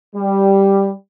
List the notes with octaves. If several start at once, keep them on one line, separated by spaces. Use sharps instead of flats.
G3